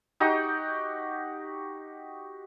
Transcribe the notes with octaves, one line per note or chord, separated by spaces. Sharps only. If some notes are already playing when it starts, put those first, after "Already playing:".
D#4 F#4 G4 G5